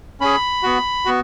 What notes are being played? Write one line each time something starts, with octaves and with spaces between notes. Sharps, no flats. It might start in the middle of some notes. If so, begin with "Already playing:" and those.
C#4 G#4 B5
B3 F#4
B3 F#4